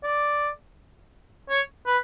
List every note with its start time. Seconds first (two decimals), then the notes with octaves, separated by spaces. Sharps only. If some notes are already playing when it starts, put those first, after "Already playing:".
0.04 D5
1.50 C#5
1.87 B4